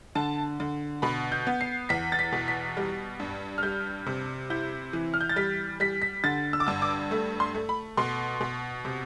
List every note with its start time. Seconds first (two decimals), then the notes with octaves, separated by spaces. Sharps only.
0.15 D3 A5
0.60 D3
1.02 B2 B5
1.32 G6
1.47 B3
1.61 C7
1.89 E2 B6
2.12 A6
2.19 B6
2.32 B2
2.48 B6
2.77 G3
3.20 G2
3.58 F6
3.63 G3 G6
4.06 C3
4.50 E4 G6
4.93 E3
5.14 F6
5.21 G6
5.29 A6
5.36 G3 B6
5.80 G3 B6
6.02 B6
6.24 D3 A6
6.53 E6
6.60 D6
6.67 G2 E6
6.82 D6
7.11 A3
7.40 C6
7.54 A3
7.69 B5
7.97 B2 C6
8.41 B2
8.85 C3